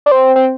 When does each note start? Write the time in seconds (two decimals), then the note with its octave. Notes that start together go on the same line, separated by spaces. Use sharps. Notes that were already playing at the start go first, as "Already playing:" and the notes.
0.06 D4
0.11 C4
0.36 C4